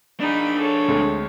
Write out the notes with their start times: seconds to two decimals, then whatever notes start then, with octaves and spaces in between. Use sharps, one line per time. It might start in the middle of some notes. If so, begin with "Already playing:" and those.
0.20 D4 D#4 G#4 B5
0.59 A4 C#5
0.88 D2 G#3 C4